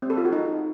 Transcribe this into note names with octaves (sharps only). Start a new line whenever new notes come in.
C4
A4
F4
F#4
D#4